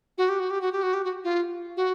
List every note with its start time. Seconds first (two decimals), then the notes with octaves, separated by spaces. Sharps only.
0.18 F#4
0.29 G4
0.40 F#4
0.51 G4
0.61 F#4
0.72 G4
0.83 F#4
0.94 G4
1.04 F#4
1.24 F4
1.77 F#4